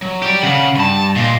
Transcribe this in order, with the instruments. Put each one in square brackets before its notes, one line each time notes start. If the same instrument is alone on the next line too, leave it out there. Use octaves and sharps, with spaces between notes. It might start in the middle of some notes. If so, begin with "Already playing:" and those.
[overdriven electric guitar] F#3
[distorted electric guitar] G4 D5
[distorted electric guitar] C#3 [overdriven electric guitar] F#5
[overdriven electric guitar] G2 [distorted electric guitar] A5 B5
[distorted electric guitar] A#2 [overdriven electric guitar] D#5 F5